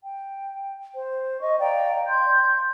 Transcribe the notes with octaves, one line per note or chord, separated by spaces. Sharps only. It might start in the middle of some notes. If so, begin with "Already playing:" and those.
G5
C5
D#5 C#6
D5 F5 G5 A#5
C6 G6